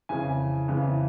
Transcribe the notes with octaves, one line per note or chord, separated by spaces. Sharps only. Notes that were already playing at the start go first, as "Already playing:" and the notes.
F2 C#3 E3 G#5
F2 C#3 E3